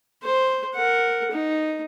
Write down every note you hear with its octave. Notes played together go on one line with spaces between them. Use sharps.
C5
A#4 F#5
D#4